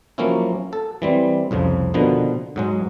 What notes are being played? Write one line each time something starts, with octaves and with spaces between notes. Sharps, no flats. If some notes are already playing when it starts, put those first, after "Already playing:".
F3 F#3 A#3 C#4 E4
A4
E3 G3 C4
C2 F2 C#3 F3
B2 D3 D#3 F3 B3
G#2 F#3 G#3